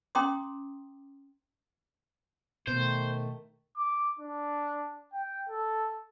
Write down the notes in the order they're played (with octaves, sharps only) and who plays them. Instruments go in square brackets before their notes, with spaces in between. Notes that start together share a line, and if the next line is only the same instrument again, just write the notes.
[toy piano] C#4 G5 A#5 C6 D6 D#6
[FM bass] B2 [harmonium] D#3 A3 [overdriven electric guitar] C5
[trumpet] D6
D4
G5
A4